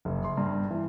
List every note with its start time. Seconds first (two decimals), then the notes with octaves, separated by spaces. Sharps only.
0.05 F#1
0.24 C6
0.37 G2
0.71 E3